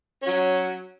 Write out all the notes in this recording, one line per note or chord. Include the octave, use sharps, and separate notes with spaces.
F#3 C#4 F#4